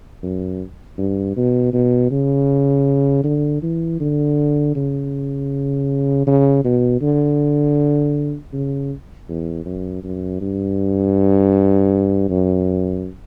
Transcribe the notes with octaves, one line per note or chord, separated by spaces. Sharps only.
F#2
G2
B2
B2
C#3
D3
E3
D3
C#3
C#3
B2
D3
C#3
E2
F#2
F#2
G2
F#2